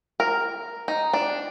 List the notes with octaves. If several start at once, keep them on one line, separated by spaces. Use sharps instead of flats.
A#4
D#4
D4